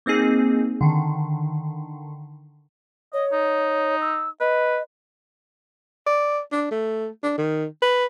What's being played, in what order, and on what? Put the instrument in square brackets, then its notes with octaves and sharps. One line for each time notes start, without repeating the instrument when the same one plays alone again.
[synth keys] A#3 C4 D#4 G#4
D3 D#3
[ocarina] C#5 [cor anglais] D#5
[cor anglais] D#4
[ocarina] E6
[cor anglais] B4 [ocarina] D#5
[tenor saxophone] D5
D4
A3
D4
D#3
B4